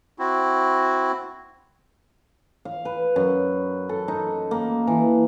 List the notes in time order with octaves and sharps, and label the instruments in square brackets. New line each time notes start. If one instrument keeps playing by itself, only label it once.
[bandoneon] C4 E4 F#4
[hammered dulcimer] F5
B4
F#2
A4
D#4
A#3
E3